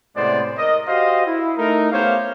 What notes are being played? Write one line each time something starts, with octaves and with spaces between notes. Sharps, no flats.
A2 C3 G#3 B3 C5 D5
A#4 D#5
F#4 G4 C5 D#5 F5
E4
A3 D#4 A#4
A3 B3 G4 C5 C#5 F5